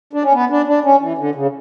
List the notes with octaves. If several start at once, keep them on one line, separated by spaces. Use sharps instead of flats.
D4
C#4
B3
D4
D4
C#4
E3
D3
C#3